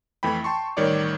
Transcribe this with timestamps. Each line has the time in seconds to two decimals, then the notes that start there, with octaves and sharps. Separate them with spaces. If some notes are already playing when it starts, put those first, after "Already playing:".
0.23 F2 E3 A3 G5 B5
0.44 G5 A5 C6 C#6
0.77 A1 D#3 G3 C#5 D5 D6